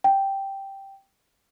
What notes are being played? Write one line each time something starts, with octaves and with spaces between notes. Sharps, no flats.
G5